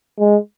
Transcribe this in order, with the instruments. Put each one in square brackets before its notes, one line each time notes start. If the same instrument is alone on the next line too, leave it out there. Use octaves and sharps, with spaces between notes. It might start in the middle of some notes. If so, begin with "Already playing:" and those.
[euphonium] G#3